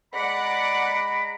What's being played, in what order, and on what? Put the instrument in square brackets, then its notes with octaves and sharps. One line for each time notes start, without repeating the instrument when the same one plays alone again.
[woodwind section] G#3 A#5 B5 [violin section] D5 F#5